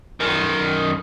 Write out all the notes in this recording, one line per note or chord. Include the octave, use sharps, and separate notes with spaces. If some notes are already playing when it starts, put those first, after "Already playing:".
F#2 D#3